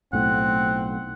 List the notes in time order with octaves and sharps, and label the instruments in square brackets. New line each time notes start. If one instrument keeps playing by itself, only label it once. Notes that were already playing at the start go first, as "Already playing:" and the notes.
[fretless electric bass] B1 A2 A3 [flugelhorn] C4 [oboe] F#5